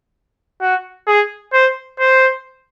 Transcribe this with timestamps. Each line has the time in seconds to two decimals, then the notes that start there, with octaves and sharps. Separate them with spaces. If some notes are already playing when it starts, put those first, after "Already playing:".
0.61 F#4
1.07 G#4
1.53 C5
1.99 C5